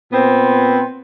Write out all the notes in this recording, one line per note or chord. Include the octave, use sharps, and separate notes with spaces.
A#2 B3 C4